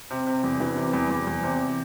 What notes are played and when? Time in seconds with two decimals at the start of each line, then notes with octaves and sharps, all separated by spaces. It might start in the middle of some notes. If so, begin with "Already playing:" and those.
0.11 C3
0.27 C3
0.43 E2
0.60 E3
0.76 C3
0.93 E2
1.10 E2
1.27 E2
1.43 C3